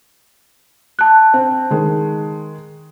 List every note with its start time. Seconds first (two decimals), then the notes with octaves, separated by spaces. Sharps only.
0.99 A5 F#6
1.34 C4
1.71 D#3 G#3